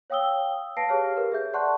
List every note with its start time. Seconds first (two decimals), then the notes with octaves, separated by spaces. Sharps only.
0.10 C#5 F5 G5 D#6 E6 G7
0.77 B4 F5 A5 A#6 C7 D7
0.89 G4 G#4 C#5 F5 F6
1.17 G4 A#4 B4
1.32 G#4 E5 G6
1.53 D5 F#5 A5 C6 C#6 F#6